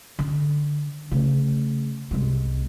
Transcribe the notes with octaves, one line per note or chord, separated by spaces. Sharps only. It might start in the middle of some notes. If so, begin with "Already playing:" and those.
D3
C#3 A3
C2 G#3